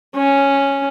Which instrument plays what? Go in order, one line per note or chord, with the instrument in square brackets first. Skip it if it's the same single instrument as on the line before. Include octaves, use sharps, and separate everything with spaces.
[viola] C#4